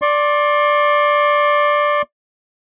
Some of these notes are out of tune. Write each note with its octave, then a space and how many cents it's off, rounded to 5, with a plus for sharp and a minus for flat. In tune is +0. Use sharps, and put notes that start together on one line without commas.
D5 +0 C6 +40